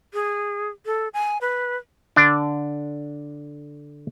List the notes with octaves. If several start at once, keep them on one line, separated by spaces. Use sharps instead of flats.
G#4
A4
G#5
B4
D3 D4